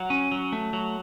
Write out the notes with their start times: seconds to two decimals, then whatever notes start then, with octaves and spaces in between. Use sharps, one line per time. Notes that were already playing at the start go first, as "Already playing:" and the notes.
Already playing: F#3 F#5 A#5
0.10 C#4
0.32 F#3
0.53 A3
0.73 F#3